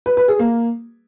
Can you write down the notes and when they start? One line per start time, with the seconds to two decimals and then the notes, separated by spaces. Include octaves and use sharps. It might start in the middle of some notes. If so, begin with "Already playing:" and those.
0.06 B4
0.17 B4
0.28 G#4
0.39 A#3